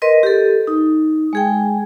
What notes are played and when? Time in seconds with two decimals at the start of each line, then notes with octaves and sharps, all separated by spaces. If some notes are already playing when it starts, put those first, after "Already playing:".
0.02 A#4 B4 D#5 C6
0.23 G4 A4
0.67 D#4
1.33 G#3 G#4 G5